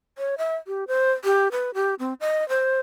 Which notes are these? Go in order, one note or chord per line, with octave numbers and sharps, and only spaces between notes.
C#5
E5
G4
C5
G4
B4
G4
C4
D#5
C5